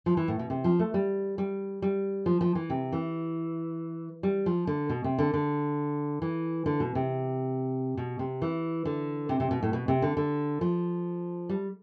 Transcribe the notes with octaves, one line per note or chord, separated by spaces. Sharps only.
F3
E3
A2
B2
C3
F3
A3
G3
G3
G3
F3
F3
E3
C3
E3
G3
F3
D3
B2
C3
D3
D3
E3
D3
B2
C3
B2
C3
E3
D3
C3
C3
B2
A2
B2
C3
D3
D3
F3
G3